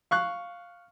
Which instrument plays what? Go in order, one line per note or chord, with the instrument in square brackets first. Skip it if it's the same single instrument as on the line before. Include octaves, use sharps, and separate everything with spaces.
[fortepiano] F5 C#6 F#6